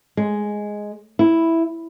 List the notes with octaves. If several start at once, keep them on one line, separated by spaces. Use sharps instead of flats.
G#3
E4